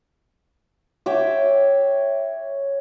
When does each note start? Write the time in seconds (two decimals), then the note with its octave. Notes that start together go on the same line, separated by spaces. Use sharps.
1.06 C#5 E5 G5 D6